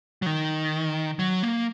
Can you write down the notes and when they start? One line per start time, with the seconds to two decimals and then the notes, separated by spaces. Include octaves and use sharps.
0.22 F#3
0.26 D#3
1.19 F#3
1.43 A#3